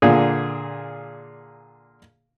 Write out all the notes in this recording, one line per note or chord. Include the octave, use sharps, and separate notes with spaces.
A#2 D3 A#3 G#4